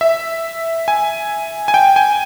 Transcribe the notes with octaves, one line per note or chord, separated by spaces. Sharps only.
E5
G#5
G#5
G5
G#5